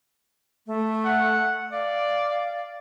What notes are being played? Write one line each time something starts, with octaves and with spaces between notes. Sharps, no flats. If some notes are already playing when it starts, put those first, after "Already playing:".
A3
F#5
D5 F5